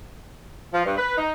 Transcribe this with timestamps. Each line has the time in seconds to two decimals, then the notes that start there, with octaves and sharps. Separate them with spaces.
0.73 F3
0.85 G2
0.97 B4
1.17 D#4